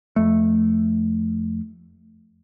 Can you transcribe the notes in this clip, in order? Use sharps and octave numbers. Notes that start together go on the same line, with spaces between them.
F2 A3